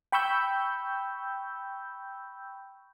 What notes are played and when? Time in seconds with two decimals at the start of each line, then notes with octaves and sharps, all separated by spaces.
0.12 G5 B5 C#6 E6 G6